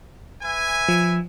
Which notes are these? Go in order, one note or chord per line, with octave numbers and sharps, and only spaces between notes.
B4 E5 G#5
F3